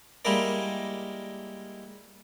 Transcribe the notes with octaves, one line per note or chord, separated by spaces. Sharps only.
G3 G#3 A#3 E4 A#4 D5